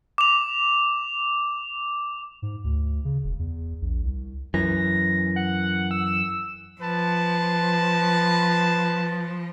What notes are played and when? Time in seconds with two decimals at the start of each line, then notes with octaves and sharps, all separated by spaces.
0.18 D6 F7
2.42 G#2
2.64 D2
3.05 C#3
3.24 E1
3.39 E2
3.81 A#1
4.03 C2
4.54 F#2 E3 A#6
5.36 F#5
5.91 E6
6.81 F3 B4 A5